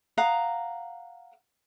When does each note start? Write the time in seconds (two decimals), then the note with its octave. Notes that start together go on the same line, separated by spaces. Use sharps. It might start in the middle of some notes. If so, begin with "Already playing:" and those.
0.18 F5 F#5 A#5 D#6